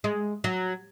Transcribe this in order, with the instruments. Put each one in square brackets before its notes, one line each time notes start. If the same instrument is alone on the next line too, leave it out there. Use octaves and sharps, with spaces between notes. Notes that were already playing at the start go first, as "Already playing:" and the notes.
[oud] G#3
F#3